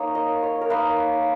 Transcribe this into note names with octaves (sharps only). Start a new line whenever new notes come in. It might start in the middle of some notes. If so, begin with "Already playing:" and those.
Already playing: A#3 D#4 C#5
D#5
C#5
A#4
A#3 D#4 B4